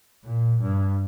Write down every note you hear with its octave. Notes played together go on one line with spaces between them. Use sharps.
A#2
G2